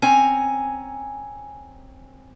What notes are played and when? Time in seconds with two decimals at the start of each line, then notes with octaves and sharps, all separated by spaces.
0.02 C4 C#4 G#5 A#5